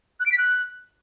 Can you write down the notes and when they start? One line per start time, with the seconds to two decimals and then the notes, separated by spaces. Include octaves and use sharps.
0.20 F#6
0.26 D7
0.32 B6
0.38 F#6